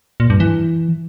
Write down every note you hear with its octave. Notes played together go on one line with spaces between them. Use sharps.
A#2
G2
E3